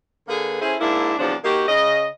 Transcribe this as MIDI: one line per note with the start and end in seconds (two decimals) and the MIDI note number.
0.28 0.56 50
0.28 0.56 58
0.28 0.56 68
0.28 0.56 71
0.61 0.75 61
0.61 0.75 64
0.61 0.75 68
0.61 0.75 69
0.61 0.75 72
0.80 1.14 44
0.80 1.14 58
0.80 1.14 62
0.80 1.14 64
1.19 1.34 40
1.19 1.34 48
1.19 1.34 53
1.19 1.34 54
1.19 1.34 62
1.44 1.63 58
1.44 1.63 63
1.44 1.63 66
1.44 1.63 67
1.68 2.06 49
1.68 2.06 75